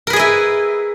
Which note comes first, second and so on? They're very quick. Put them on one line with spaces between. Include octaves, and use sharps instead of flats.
A#4 B4 G#4 D#5 E4